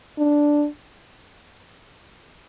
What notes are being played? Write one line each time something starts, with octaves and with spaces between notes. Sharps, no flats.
D4